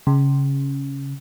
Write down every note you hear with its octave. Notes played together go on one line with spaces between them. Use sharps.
C#3